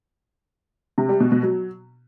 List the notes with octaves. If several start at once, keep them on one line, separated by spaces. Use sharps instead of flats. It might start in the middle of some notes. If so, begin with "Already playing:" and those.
C3
G3
B2
B2
F#3